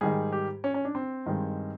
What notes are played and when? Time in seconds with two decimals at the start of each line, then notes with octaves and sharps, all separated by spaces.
0.01 G#2 D#3 G3 G#4
0.32 G4
0.64 C#4
0.74 C#4
0.85 D4
0.95 C4
1.26 G2 D#3 G#3